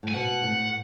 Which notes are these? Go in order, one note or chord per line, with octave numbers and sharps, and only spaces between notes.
A2
G#5
B2 F#5
A2